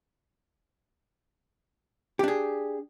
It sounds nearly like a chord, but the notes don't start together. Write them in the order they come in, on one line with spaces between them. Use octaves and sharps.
G4 D4 G#4